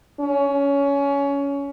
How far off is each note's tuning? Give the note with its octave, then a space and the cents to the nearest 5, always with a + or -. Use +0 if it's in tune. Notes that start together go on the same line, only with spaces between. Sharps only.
C#4 +20